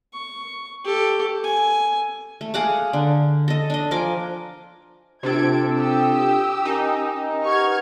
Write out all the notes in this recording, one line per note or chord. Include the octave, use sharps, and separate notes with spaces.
C#6
G4 A4
G#5
A3
G#4 F5 F#5 D6
D3
A4 D#5
D4 D#5
F3 A#4 G#5 D6
C3 D4 F4 A4 G#6 D7
G4 D#6 E6
C#4 D#4 A#4 G#5
G4 B4 F#5 C#6 F6 G#6